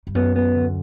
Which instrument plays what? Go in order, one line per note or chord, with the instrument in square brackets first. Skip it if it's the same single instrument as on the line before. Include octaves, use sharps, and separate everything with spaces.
[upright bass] G2
[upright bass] F#2 [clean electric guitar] B3
[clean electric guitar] B3
D2